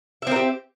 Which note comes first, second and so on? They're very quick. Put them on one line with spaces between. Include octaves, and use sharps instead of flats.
E5 C4 A#4 G4